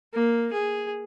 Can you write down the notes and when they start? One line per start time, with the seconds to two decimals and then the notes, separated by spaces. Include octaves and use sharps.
0.13 A#3
0.53 G#4